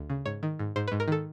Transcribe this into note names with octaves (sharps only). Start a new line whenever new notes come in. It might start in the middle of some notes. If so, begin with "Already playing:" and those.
Already playing: D2
C#3
G#2 C#5
D#3
G#2
G#2 C5
G#2 B4
A#4
D#3 A4